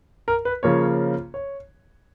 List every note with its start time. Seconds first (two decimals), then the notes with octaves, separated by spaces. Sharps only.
0.28 A#4
0.45 B4
0.63 C#3 F3 A#3 C#4 C#5
1.34 C#5